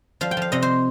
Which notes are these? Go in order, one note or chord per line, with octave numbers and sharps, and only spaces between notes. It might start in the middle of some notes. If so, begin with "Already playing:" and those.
F3 F5
G5
F3 F5
C3 D#5
C5